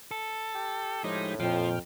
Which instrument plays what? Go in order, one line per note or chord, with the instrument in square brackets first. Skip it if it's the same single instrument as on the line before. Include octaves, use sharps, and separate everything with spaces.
[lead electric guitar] A4
[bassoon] G4
[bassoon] A2 [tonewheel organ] F3 G#3 G4 [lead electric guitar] D#4
[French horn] F2 [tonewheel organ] A#2 G5 F6 [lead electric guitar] F3